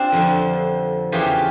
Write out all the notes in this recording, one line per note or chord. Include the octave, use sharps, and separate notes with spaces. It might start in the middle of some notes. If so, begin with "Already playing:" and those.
Already playing: C4 D4 F4 G4
F2 D3 F3
E2 C#3 E3 F4 G4